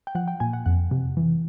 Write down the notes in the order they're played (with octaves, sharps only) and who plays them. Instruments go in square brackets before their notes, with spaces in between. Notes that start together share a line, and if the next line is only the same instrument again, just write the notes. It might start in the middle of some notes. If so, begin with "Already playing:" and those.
[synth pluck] G5
F3 F#5
G5
A#2 G#5
F#5
F2 F#5
C3
E3